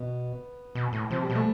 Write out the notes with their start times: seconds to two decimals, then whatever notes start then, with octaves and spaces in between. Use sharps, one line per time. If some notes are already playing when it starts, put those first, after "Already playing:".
Already playing: B2 B3
0.75 B2
0.93 A2
1.10 C3 F3
1.23 G3
1.30 B2
1.35 A3